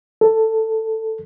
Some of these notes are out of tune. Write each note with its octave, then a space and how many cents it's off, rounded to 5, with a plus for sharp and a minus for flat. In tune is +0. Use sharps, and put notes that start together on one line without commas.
A4 +10